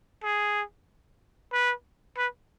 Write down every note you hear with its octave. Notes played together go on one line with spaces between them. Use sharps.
G#4
B4
B4